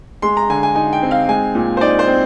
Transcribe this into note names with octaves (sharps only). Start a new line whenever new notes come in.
G#3 C6
A#5
D3 G#5
G#5
D#4 G#5
G5
C4
F5
G#3 G#5
A#2
C5
D#4 D5
C5
C4